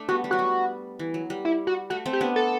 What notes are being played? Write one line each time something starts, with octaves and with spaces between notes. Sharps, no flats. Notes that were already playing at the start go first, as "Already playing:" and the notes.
Already playing: A3 D4
G3 B3 F#4
G3
F#3 F#4
G3
E3
F#3
G3
E4
F#4
A3 F#4
A3 C4
G4
B3 D4
A4